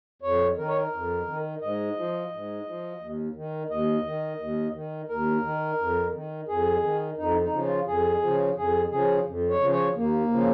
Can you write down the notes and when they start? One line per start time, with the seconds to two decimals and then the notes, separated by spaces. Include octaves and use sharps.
0.22 F2 C#5
0.58 D#3 A#4
0.68 C#5
0.77 A#4
0.93 F2
1.27 D#3
1.61 G#2 D#5
1.96 F3
2.32 G#2
2.65 F3
3.00 D#2
3.35 D#3
3.70 D#2 D#5
4.05 D#3
4.39 D#2
4.74 D#3
5.09 D#2 A#4
5.44 D#3
5.79 F2
6.13 D#3
6.48 F2 G#4
6.83 D#3
7.17 F2 D#4
7.41 D#4
7.52 C#3 F3
7.64 F4
7.86 F2 G#4
8.22 C#3 F3
8.56 F2 G#4
8.91 C#3 F3 G#4
9.25 F2
9.50 C#5
9.60 C#3 F3
9.72 C#5
9.95 D#2 A#3
10.30 C#3 F3